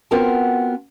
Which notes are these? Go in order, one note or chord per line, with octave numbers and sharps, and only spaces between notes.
B3 C4 F4 F#4 A#4 A5